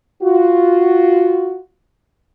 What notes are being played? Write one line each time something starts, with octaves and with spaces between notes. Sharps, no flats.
F4 F#4